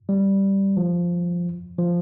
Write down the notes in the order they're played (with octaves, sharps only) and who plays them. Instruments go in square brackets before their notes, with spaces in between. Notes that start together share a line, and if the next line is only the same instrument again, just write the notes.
[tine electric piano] G3
F3
F3